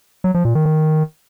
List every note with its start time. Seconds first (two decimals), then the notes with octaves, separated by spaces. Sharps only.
0.24 F#3
0.34 F3
0.45 A#2
0.55 D#3
0.66 D#3